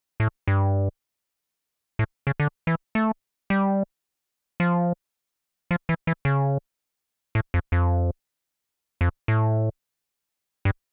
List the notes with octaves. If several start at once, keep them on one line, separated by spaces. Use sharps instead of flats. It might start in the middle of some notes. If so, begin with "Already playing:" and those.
A2
G2
A2
C#3
D3
E3
A3
G3
F3
F3
E3
E3
C#3
A2
F2
F2
F2
A2
G2